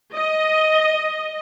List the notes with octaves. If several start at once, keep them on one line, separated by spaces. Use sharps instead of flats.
D#5